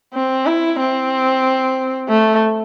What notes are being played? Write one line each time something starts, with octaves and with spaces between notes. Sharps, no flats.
C4
E4
C4
A3